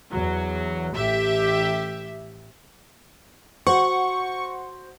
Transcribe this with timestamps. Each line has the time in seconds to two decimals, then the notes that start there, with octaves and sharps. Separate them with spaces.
0.12 E2 F#3
0.95 A1 G4 E5
3.67 F#4 C5 F#5 C#6